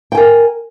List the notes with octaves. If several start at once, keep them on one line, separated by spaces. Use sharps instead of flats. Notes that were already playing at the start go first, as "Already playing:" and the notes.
A#4 G5 G#5